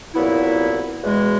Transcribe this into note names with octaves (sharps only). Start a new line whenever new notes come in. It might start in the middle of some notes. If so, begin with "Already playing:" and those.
C2 A#2 F#3 B3 E4
E2 B2 G#3